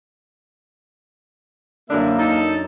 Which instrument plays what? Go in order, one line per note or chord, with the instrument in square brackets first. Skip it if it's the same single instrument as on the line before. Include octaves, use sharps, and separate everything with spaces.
[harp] F#2 D4 [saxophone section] D3 E4 E5 [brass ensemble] A#3
[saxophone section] D#4 [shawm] A4